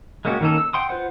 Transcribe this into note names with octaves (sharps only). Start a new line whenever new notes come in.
G#3 A#3 C#4 F#4 G4
D#3 A#3 C#4 D#4 A4
E6
F#5 G5 C6 D#6
F4 B4 C5 F#5